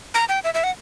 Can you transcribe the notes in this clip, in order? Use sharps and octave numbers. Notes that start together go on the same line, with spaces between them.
A#5
G5
E5
E5
F#5